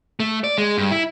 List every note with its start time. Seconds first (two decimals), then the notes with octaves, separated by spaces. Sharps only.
0.20 A3
0.44 D5
0.58 G#3
0.78 G2
0.91 E4